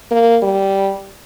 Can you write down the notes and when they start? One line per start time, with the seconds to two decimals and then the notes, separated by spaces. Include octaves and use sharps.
0.11 A#3
0.42 G3